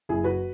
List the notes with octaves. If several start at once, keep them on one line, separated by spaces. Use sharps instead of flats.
F#1 E4 G#4
F#4 B4